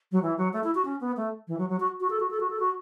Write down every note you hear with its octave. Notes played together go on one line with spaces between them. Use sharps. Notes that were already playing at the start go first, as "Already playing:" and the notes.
F#3
E3
F#3
A3
E4
F#4
C#4
B3
A3
E3
F#3
F#3
F#4
F#4
A4
F#4
A4
F#4
A4
F#4